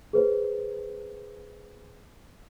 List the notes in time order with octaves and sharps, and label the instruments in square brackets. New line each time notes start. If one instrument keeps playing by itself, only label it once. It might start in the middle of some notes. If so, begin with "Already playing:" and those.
[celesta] G#4 B4 C5